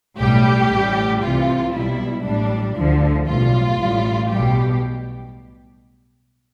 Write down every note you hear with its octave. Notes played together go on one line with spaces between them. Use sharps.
B1 A2 G3 G4
A1 A2 G3
C2 C3 E3 F4
B1 B2 G3 E4
A1 A2 G3 D4
D2 D3 F3
B1 A2 G3 F4
A1 A2 G3
B1 B2 G3 G4